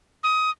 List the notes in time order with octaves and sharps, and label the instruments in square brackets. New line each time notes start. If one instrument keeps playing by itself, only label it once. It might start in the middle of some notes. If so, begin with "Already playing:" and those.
[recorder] D#6